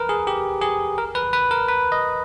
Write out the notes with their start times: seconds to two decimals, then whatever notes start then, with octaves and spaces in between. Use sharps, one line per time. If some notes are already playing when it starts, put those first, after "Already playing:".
Already playing: A#4 B4
0.09 G#4
0.27 G4
0.61 G#4
0.98 A#4
1.15 B4
1.33 B4
1.51 A#4
1.68 B4
1.92 D#5